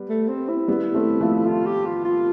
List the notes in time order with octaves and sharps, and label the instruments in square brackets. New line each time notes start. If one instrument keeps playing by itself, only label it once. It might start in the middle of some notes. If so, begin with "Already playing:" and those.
Already playing: [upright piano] G3 B3
[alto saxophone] A3
C4
E4
[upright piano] G3 B3
A3 C4
F3 A3
[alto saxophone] F4
G4
F4
F4